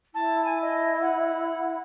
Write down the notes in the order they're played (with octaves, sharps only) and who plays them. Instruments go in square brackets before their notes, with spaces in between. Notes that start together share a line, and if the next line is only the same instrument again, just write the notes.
[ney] E4 [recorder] A5
[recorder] G#5
D#5
F#5